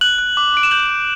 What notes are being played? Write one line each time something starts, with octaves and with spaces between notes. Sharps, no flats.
F#6 F#7
F#6
D6
D6 D7
E7
G6 F#7
G6